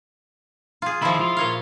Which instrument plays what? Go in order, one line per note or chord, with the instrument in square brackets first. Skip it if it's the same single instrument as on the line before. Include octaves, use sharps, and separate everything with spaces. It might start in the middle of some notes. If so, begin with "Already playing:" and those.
[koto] F4 G#4
[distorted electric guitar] D#3 B5 [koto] F3 E4
[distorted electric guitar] F4
[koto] A#2 C#5 F5